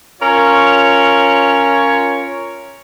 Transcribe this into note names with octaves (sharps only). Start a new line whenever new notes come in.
C#4 F4 A#4 C#5